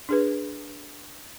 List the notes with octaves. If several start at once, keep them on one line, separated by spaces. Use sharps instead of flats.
D4 G#4 B4